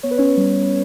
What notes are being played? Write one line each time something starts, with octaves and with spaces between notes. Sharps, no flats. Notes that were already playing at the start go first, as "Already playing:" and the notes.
B3 C#5
B4
C#4 C#5
G3